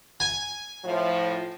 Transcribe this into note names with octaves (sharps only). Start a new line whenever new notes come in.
G#5
A2 F3